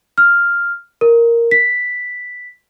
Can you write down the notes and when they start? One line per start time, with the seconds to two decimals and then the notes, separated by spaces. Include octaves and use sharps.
0.18 F6
1.01 A#4
1.51 B6